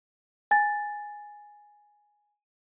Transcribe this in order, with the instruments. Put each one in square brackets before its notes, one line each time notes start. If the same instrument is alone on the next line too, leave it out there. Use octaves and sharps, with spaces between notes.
[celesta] G#5 A6